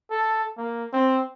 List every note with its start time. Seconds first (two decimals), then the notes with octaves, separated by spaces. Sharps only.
0.11 A4
0.58 A#3
0.93 C4